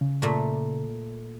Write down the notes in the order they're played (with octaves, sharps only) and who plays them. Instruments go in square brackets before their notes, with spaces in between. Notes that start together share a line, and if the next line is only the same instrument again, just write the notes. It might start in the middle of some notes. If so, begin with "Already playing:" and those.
[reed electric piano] C#3
[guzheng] A#2 A3